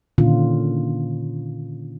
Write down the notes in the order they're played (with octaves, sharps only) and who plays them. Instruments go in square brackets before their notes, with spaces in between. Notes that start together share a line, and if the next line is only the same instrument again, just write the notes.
[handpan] A#2 D3 D#3 C#4 F4